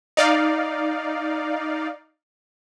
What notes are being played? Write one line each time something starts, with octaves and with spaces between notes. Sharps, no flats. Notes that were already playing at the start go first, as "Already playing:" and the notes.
D#4 D5 F5